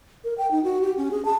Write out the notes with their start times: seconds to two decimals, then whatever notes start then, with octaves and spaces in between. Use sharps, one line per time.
0.24 A#4
0.38 G5
0.51 D#4
0.64 F#4
0.81 G4
0.97 C#4
1.11 G#4
1.25 A5